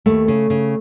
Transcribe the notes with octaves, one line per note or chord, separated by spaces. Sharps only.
D#2 A3
C#3
C#3